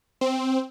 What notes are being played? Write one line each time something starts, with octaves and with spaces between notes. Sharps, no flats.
C4